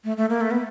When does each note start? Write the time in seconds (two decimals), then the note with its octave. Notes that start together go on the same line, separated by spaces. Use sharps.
0.04 A3
0.17 A3
0.30 A#3
0.41 A3
0.51 B3